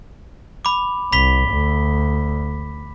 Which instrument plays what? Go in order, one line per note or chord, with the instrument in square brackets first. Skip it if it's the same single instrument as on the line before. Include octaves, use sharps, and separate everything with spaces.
[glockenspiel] B5 D6
[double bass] C2 [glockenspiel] B5 B6 G7
[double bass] D2